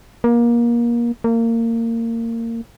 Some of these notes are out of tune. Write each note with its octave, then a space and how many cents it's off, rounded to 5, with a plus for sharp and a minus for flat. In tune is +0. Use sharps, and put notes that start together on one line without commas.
A#3 +25
A#3 -25